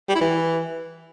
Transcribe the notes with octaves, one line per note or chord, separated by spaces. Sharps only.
G3
E4
E3